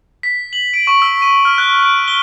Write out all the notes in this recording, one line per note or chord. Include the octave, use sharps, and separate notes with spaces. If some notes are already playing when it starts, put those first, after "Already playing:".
B6
F#7
D7
C#6
E6
D#7
F6
F#6
D7
G7